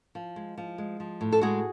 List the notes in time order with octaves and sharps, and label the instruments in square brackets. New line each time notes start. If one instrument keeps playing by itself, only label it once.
[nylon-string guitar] F3
G#3
F3
G#3
F3
A2
A4
G#3 F#4 G#4